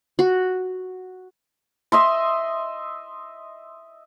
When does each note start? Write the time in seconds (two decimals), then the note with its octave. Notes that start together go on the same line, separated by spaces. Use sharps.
0.19 F#4
1.92 D#5 E5 C6